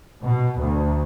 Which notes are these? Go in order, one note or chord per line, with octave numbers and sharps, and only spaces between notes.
B2
D2